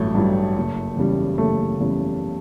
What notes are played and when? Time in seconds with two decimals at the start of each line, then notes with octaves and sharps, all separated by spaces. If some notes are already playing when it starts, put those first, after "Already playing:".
Already playing: A1 G2 F#3 A3
0.15 G2 F#3
0.57 F#1
0.97 E2 C#3 G3
1.38 F#1 A3
1.79 E2 C#3 G3